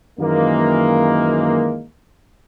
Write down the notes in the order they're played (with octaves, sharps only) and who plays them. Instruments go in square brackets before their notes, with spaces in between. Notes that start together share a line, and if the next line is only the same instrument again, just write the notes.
[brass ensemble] F#2 D#3 E3 G#3 A#3